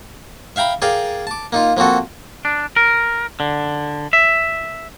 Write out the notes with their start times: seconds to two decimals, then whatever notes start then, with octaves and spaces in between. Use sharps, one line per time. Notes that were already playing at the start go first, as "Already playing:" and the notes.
0.56 E5 F5 G5 A#5 B5
0.82 G#4 A#4 D5 F5 G5
1.27 A5 D6
1.52 A#3 D#4 F4
1.77 F3 A#3 C4 F#4 A4
2.45 D4
2.76 A#4
3.40 D3
4.13 E5